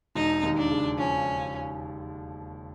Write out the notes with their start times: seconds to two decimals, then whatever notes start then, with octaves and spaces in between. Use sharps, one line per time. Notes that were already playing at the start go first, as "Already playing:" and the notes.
0.15 E1 D#4
0.43 D#2
0.57 D4
0.71 C#3
0.98 F3 C#4